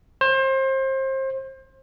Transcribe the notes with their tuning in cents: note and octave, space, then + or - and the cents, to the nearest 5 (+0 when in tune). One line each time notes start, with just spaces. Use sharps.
C5 +30